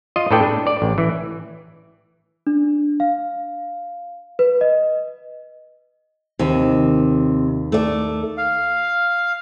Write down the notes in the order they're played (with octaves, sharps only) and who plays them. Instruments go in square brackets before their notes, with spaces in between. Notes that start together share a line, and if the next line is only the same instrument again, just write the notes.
[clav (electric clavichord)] F4 D#5
A2 D4 A4 B4 D5 G5
D4
D5
A1
E3
[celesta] D4
F5
B4
D#5
[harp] D#2 [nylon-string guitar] C3
[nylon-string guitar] A3 D5
[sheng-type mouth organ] F5